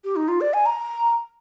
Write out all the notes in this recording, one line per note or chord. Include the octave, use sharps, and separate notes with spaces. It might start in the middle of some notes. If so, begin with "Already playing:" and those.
G4
D#4
F4
D5
G#5
A#5